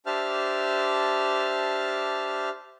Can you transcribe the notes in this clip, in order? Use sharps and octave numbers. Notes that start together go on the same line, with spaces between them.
D4 G4 C5 E5 A5 F6